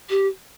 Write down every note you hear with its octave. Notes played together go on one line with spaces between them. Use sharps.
G4